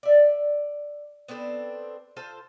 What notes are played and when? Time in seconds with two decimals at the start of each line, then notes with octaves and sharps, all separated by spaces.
0.03 D5 E5
1.28 B3 C4 D4 A4
2.17 F4 A4 C5 A5